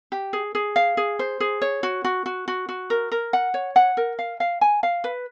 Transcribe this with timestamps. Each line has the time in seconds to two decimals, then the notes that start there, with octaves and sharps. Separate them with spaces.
0.12 G4
0.33 G#4
0.55 G#4
0.76 F5
0.97 G#4
1.19 C5
1.40 G#4
1.62 C#5
1.83 F#4
2.04 F#4
2.26 F#4
2.48 F#4
2.69 F#4
2.90 A#4
3.12 A#4
3.33 F#5
3.54 C#5
3.76 F#5
3.97 A#4
4.19 F5
4.40 F5
4.61 G#5
4.83 F5
5.04 B4